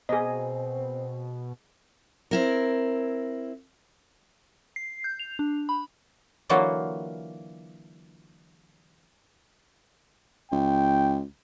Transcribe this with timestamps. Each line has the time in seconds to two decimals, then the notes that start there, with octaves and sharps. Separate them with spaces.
0.09 B2 C4 G#4 D#5
2.31 C4 E4 A#4
4.76 C7
5.04 G6
5.19 F7
5.39 D4
5.69 B5
6.49 D3 E3 F#3 A#3 F4 F#4
10.52 C#2 G5